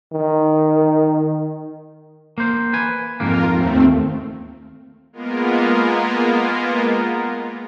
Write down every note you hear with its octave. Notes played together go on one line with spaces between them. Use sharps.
D#3
A#3 C5
B4 G#5
F2 G#2 A#3 F4 A#4
D#2 A3 C4
G#3 A#3 B3 F4 A#4